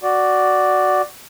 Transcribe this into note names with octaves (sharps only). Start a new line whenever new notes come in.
F#4 D5